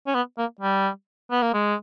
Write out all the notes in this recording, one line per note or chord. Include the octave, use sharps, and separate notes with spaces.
C#4
B3
A#3
G3
B3
A#3
G#3